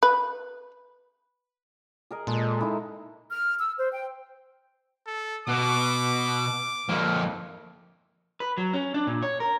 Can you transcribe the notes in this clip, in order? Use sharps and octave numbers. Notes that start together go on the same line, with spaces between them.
B4
G#4 A#4 D#5
A#2 G#3 A4
D#4 E4
F6
E6
C5
G5
A4
B2 D6
F2 A#3
B4
F#3
C#4
D4
A#2
C#5
A#4